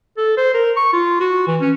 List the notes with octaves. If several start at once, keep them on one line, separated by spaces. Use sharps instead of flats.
A4
C5
A#4
C#6
F4
F#4
E3
C#4